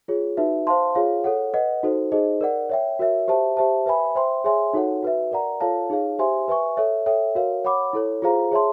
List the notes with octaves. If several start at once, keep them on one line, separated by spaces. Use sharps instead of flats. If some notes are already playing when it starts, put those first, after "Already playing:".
F4 G#4 C#5
D#4 F#4 B4 E5
C5 F5 A5 C6
F4 G#4 C#5 F5
A4 C#5 F#5
B4 D#5 F#5
D#4 F#4 A4 C5
D#4 G#4 C5 D#5
A#4 D5 F#5
C#5 E5 G5
F#4 A#4 C#5 E5
G4 C5 E5 A5
G4 C5 E5 A5
B4 E5 G#5 B5
C5 E5 G5 C6
G#4 C#5 E5 G#5 C6
D#4 F#4 A4 C#5 F#5
F#4 B4 E5
A#4 D5 F#5 A#5
F4 A4 C#5 F5 A5
D#4 G#4 C#5 F5
G4 C5 E5 G#5 C6
B4 E5 G#5 C#6
A4 C#5 E5
A4 C#5 E5 G5
F#4 A#4 C#5 F5
C#5 F#5 B5 D6
E4 A4 C#5
F4 G#4 C5 F5 A#5
G#4 C#5 E5 A5 C6